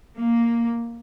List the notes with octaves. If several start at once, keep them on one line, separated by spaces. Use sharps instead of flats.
A#3